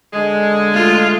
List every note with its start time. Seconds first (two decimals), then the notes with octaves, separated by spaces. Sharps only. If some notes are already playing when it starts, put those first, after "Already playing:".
0.13 D3 G#3
0.71 A3 F4